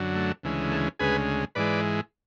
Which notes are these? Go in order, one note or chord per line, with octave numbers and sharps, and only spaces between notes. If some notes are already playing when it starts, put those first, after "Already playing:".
Already playing: F#2 D3 F#3
A3
D2 C#3 E3 G#3
A3
D2 C#3 G#3 G#4 B4
G#2 E3 G#3 B4 D5